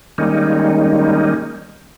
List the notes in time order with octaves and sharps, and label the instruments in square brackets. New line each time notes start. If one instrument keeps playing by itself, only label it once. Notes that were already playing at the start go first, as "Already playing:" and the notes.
[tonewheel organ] D#3 G3 G#3 A#3 C#4 D#4